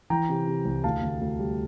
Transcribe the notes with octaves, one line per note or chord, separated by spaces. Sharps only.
E3 G5 A#5
C3
C3
C2
D2 F5 A5
D2
D2
G3